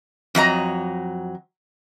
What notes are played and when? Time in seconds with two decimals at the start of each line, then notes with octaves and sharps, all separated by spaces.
0.35 F2 F#3 D#5 A#5